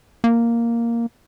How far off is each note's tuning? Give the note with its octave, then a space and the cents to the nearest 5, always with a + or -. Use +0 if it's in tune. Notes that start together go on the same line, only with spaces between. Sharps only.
A#3 +0